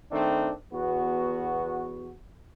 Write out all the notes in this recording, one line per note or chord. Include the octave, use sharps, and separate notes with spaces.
D#3 A3 C4 D4
E2 B3 F#4